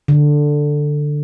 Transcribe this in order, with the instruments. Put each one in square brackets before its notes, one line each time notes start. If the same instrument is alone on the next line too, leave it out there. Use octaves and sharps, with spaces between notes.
[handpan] D3